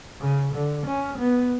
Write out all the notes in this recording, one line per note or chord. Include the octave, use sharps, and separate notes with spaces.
C#3
D3
C#4
B3